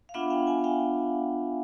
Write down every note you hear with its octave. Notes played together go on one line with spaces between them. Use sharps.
F5
B3 D4 F4 E5 F#5
F5 G5
F#5 G#5
F5 G5